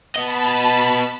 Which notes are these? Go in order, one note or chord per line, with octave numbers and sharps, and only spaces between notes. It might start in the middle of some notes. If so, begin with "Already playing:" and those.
B3 D#5 A5 B5